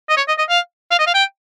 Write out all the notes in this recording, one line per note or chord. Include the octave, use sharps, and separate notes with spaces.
D#5
C#5
D#5
D#5
F5
F5
D#5
F5
G5